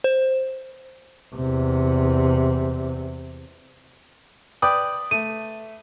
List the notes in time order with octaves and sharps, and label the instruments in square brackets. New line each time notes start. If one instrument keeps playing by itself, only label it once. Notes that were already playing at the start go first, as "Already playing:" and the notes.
[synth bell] C5
[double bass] E2 C3
[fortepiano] B4 D5 G5 [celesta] D#6
[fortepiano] A3 [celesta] D#7